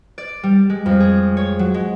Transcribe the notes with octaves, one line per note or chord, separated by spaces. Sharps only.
D5
G3
G#3
F2
G#4
C#5
F#3
G#3